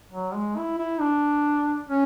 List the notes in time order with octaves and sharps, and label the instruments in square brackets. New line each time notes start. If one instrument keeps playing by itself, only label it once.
[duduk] F#3
G#3
E4
E4
D4
C#4